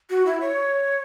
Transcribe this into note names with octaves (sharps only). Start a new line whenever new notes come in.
F#4
E4
C#5